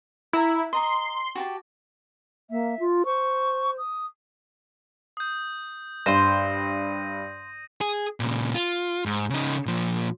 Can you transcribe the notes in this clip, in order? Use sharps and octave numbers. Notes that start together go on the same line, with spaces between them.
E4 E5 F#5 A#5
D#5 A#5 C6 C#6
F#4 G4 A5
A#3 E5
F4
C5 C#6
D#6
D#6 G6
G2 C5 C6 A#6 D#7
G#4
A#2 C#3
F4
G#2
C#3 D#4
A#2 F3